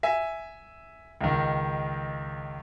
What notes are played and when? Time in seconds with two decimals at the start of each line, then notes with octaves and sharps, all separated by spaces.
0.03 E5 G#5
1.21 C#2 D#3